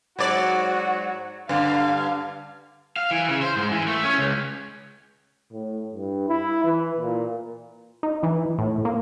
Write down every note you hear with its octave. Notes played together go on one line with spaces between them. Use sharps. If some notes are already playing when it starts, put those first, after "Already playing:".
G#2 F#3 F#4 D5
G2 D3 F5
F5
E3
C#3
C5
G#2
E3
A3
C#4
C#2
A2
G2
E4
E3
A#2
D#4
E3
A2
A#3